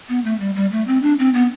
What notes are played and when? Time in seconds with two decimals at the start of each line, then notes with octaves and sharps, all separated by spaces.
0.09 B3
0.25 A3
0.40 G3
0.56 G3
0.72 A3
0.87 C4
1.03 D4
1.19 C4
1.34 B3